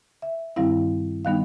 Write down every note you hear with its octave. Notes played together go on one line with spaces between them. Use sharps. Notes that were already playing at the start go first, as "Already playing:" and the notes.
E5
G2 D#3 G3 C4 E4 F5
D#3 G3 B3 D#4 F5